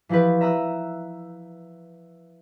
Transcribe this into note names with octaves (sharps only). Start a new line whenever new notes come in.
E3 F3 E4 G4 B4
E5 A#5 D#6 E6 F#6